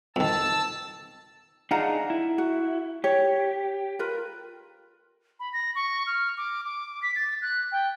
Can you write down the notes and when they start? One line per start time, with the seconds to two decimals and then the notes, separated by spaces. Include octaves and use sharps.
0.16 F2 D#3 A5 E6
1.71 D4 D#4 F4 G#4 F#5 A#5
2.10 E4
2.38 F#4
3.04 G4 C#5
3.99 F4 A#4 B4
5.40 B5
5.53 A#6
5.75 C#6
6.07 F6
6.37 D6
6.65 D6
7.02 B6
7.16 A6
7.42 F#6
7.72 G5